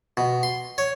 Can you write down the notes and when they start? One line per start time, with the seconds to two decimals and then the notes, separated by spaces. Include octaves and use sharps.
0.17 B2
0.43 C6
0.78 C#5